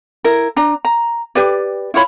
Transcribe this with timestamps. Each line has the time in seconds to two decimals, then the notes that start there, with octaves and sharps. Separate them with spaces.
0.24 E4 A#4
0.56 D4 A#5
0.85 A#5
1.35 G4 B4 D5
1.94 E4 F4 C#5 B5